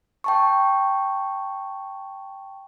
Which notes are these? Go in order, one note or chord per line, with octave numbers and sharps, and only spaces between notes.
G5 A5 C#6